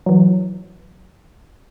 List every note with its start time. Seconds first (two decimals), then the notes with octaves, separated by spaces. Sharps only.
0.06 E3 F#3